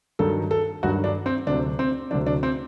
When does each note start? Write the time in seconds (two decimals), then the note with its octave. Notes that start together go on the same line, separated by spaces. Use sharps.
0.19 G2 D#3 F#3 A4
0.51 A4
0.83 G2 D#3 F#3 F#4
1.04 D4
1.26 C4
1.47 D2 C3 F#3 D4
1.79 C4
2.11 D2 C3 F#3 D4
2.26 D4
2.43 C4